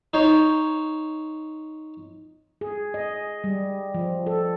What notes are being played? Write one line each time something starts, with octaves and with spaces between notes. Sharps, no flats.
D#4 C5 C#5
G#4
D#5
G3
F3
A4